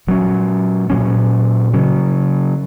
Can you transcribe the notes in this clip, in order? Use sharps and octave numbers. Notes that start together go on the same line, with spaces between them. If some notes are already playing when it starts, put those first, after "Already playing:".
A#2 F#3 C#4
A#2 F#3 C#4
C#3 F#3 C#4